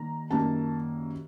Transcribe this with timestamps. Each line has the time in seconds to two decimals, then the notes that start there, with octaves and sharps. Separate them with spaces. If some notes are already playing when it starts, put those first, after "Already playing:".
Already playing: D#3 G3 A#3 A#5
0.30 F#2 D#3 G3 A#3 A5